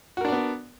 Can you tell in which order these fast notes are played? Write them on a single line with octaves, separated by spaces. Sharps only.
F#4 A#4 D4 D5 B3